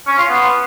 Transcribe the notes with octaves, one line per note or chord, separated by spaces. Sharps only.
C#4
F4
B3